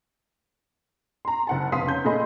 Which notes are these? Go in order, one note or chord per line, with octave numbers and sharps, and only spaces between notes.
A#5 C6
F#1 F#5 A5
F1 F5 C6 D#6 B6
C#4 C#5 G6
A#2 A3 G#4 D#5 B5 C6